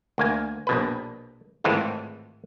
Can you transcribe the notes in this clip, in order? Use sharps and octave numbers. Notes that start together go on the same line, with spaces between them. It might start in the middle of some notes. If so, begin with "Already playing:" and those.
D2 A#3 G#5
A#1 B2 B4
G#1 A2 E3 G#3 C4 F4